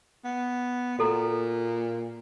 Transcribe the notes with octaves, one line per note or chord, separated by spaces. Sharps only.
B3
A#2 F#4 A4 A#5